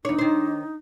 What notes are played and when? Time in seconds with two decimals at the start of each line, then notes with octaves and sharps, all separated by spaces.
0.05 E2 D4 D#4 C#5
0.18 D#3 C5